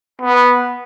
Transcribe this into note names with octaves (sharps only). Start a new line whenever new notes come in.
B3